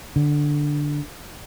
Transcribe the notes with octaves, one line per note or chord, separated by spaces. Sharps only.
D3